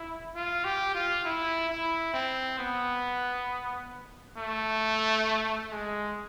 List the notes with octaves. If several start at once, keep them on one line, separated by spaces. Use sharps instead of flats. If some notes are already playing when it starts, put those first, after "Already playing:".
Already playing: E4
F4
G4
F4
E4
E4
C4
B3
A3
G#3